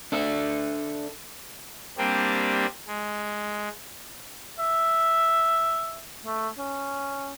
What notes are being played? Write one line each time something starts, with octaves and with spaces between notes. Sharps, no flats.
D4 A4 E5
G3 A#3 C4 D4 G4
G#3
E5
A3
C#4